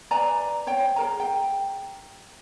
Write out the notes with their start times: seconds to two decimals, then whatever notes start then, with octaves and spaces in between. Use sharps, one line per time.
0.11 B4 D5 G#5 A#5
0.67 C5 C#5 G5
0.96 G#4 A#4 A#5
1.20 G5